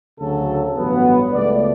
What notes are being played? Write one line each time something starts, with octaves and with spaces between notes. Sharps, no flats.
D2 C#3 F#3 A4
A1 G2 F#3 B3
C#2 B2 A3 D5